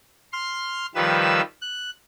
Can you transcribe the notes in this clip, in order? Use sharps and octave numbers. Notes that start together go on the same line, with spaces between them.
C6 F6
D#3 F3 G3 B4 E6
F#6